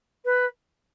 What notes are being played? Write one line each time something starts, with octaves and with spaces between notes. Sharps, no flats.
B4